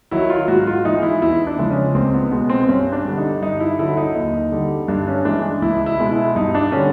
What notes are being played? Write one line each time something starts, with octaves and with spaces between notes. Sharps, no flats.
D#3 F#3 E4
F4
G#2 F#4
F4
E3 G#3 D#4
E4
E2 E4
D4
C#3 F3 G#3
C#4
C#2 C4
B3
B2 G#3 B3
C4
G2 C#4
D4
D3 G3
D#4
G2 D#4
E4
D3 F#3 E4
D#4
D#2
D3 G3
G2 D4
C#4
E3 G#3 D4
C#2 E4
E4
B2 G#3
E4
G2 D#4
D4
D3 G3 C#4